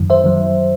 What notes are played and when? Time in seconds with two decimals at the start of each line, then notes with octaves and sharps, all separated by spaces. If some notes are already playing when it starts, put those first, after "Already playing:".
Already playing: F#2 D#3 F#3
0.10 C5 E5
0.24 D#3 F#3